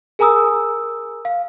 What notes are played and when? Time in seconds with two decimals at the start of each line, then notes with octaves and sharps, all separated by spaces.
0.19 G#4 A#4 G#5 A#5 D#6 E6
1.25 F5